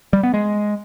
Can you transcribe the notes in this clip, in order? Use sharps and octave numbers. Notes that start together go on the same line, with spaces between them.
G3
B3
G#3